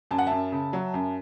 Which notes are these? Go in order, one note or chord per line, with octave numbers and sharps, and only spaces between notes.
F#2 A5
F#5
F#2 E5 A5
C#3
F#3
F#2